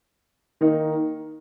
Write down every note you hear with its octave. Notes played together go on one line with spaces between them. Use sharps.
D#3 A#3 D#4